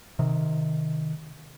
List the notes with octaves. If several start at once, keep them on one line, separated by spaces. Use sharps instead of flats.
C3 D#3